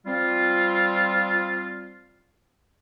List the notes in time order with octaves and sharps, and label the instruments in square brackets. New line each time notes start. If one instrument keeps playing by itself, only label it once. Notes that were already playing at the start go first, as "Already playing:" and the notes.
[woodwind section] F3 G3 C4 F4